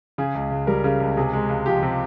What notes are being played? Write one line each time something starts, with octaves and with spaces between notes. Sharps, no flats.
C#3 G#4
C#2
C#2
G3 A#4
C#3
C#2
C3 G#4
G#3
C#2
F3 G4
C3